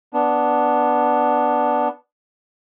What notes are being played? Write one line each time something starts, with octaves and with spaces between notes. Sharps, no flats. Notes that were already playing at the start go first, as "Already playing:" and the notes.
B3 D4